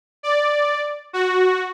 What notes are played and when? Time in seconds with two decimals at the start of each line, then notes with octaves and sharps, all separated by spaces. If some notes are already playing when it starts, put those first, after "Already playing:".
0.23 D5
1.13 F#4